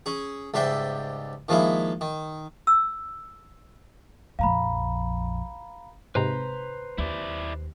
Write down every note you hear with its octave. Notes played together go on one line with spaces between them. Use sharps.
C#4 G#4
C#2 G#2 G3 C5 E5 G5
D#3 F3 G#3 A#3 E4
D#3
E6
A#1 F2 F5 A#5 B5
G#2 C3 B4 C5 A#5
D#2 E4 D5